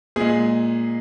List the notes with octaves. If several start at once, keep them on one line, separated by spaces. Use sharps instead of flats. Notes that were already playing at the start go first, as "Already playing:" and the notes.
A#2 G#3 G#4